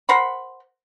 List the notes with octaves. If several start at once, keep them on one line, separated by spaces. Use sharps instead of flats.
A#4 C5 F#5 B5